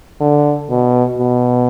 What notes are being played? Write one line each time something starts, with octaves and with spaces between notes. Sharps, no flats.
D3
B2
B2